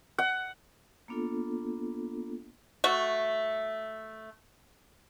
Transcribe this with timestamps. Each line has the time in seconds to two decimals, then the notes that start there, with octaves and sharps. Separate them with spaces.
0.18 F#5
1.08 A#3 B3 D4 F4 A4
2.84 A3 F#4